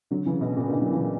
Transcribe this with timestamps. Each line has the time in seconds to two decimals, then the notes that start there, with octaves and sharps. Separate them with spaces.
0.11 D3 F#3
0.26 C#3 E3
0.41 B2
0.56 A#2 C#3
0.71 B2 D3
0.82 F#3
0.92 C#3 E3